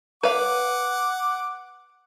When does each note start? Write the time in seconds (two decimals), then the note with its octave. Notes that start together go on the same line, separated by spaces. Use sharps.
0.23 B4 F5 F#5 D6